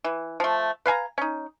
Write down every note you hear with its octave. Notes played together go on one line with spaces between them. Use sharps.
E3
F3 A3
B4 F5 G#5 A#5
C#4 D#4